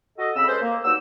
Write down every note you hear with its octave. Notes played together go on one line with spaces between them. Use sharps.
F#4 A4 D#5
A2 C#3 C4 B5 E6
G#3 C#4 A4 B4 C5
A#3
G2 F#3 A#3 D#4 F#4 E6